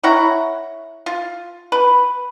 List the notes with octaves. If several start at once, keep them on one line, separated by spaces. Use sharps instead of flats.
E4 C#5 F#5 A#5
F4
B4